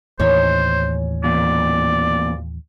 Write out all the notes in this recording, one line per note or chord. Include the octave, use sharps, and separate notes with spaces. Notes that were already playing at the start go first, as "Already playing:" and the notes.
D#2 A2 E3 C#4 D#4 C5 C#5
E2 A#2 D5